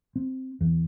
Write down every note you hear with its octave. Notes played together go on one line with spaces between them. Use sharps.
C4
E2